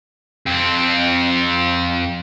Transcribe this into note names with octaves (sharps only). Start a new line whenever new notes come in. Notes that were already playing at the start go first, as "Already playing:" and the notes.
F2 C4